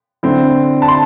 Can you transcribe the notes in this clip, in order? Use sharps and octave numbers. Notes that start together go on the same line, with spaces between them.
D3 C4 E4
A5
C6